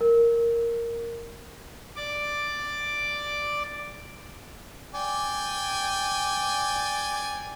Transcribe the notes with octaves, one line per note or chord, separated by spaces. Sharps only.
A#4
D5 D6
D5 G5 G#5